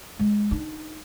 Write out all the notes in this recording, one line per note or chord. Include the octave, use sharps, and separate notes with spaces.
G#3
D4 D#4